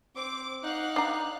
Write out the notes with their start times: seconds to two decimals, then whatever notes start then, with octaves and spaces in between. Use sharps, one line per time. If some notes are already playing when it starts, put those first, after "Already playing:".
0.16 C4 D6
0.63 D#4 F5 F#5 F#6
0.96 D4 A#5